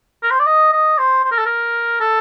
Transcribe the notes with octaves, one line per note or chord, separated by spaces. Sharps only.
A#4
C5
D5
D#5
D#5
C5
C5
A#4
A4
A#4
A4